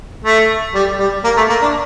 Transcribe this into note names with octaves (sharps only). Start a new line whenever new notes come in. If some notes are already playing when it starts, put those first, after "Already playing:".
A3
G3
G3
A#3
A3
A#3
D4